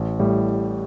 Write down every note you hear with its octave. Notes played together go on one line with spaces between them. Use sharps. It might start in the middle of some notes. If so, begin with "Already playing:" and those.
Already playing: A1
A2 G3